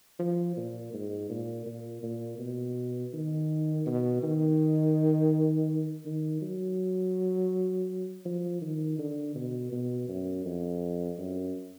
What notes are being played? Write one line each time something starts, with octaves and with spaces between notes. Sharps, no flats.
F3
A#2
G#2
A#2
A#2
A#2
B2
D#3
B2
D#3
D#3
F#3
F3
D#3
D3
B2
B2
F#2
F2
F#2